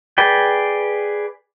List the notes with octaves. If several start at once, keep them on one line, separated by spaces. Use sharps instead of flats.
G#4 B4 D5 G5